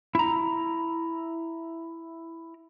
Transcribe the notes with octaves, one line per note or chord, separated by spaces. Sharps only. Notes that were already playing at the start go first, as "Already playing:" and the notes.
E4 A#5